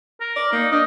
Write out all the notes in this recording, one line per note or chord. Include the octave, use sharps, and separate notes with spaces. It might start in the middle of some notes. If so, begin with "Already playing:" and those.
A#4
D5
A#3 D#4
D4 D#5